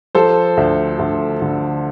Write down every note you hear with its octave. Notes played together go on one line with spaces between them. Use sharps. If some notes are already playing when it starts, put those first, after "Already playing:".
F3 A4 C5
D2
D2
D3